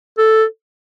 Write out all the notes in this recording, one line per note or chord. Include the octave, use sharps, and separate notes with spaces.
A4